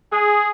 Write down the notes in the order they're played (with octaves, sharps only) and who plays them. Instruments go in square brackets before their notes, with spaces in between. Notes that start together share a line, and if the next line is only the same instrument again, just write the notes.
[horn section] G#4